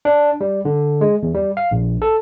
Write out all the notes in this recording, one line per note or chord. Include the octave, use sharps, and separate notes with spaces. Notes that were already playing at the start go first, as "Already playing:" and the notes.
D4
G3
D3
G#3
E2
G3
F5
A#1
A4